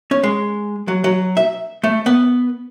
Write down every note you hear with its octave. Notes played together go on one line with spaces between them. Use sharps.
C#4
G#3
F#3
F#3
E5
A3
B3